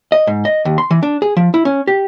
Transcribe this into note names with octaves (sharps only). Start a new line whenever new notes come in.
D#5
G#2
D#5
D#2
C6
E3
D4
G#4
F3
E4
C#4
G4